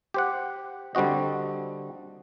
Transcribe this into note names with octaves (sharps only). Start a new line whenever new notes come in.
G4 C5 F#5
D3 G3 C4 F#4 D#5